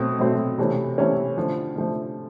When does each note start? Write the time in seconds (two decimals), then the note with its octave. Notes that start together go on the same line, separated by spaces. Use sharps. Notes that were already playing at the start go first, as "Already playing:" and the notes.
Already playing: B2 F#3 A3 C4
0.19 B2 F#3 A3 C4
0.58 C3 E3 A3 C#4
0.98 C3 E3 A3 C#4
1.37 D3 F3 A3
1.75 D3 F3 A3